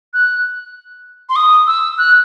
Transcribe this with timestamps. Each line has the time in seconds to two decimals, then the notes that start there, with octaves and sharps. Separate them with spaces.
0.14 F#6
1.29 C6
1.36 D#6
1.67 E6
1.98 F#6